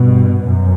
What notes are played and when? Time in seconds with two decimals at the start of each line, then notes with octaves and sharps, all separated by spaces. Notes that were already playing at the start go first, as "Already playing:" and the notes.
Already playing: G2 B2
0.42 F#2